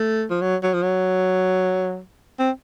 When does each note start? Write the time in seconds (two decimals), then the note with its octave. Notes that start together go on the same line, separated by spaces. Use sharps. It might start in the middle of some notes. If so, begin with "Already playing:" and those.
Already playing: A3
0.30 F3
0.41 F#3
0.63 F#3
0.74 F3
0.83 F#3
2.39 C4